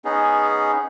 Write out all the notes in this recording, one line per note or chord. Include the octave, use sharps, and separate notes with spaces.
B3 C#4 D#4 G#4